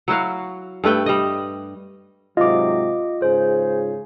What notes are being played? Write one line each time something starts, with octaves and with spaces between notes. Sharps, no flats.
F#3 E4 F#4 F5
G2 A3 B4 G5
G3 D#5
G#2 C3 F#3 F4 D#5 D6
G#2 C#3 G#4 C5